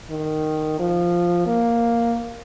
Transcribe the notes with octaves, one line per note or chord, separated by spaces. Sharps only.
D#3
F3
A#3